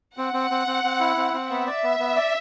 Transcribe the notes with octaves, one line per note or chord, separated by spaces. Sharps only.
C4 F#5
C4
C4
C4
C4
E4
C4
C4
B3 E5
D5
B3
B3
D5